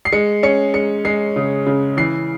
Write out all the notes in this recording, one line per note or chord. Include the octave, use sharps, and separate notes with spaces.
C7
G#3 C#7
C#4 C#7
G#3 C#7
G#3 C7
C#3
C#3
E3 C7